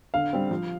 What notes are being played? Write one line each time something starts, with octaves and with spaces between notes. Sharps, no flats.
D3 F5
G3 C4
F3